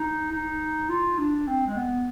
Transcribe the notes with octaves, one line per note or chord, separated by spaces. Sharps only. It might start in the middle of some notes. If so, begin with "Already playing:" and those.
Already playing: D#4
D#4
F4
D4
C4
G#3
B3